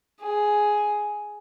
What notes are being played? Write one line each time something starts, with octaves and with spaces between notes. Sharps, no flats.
G#4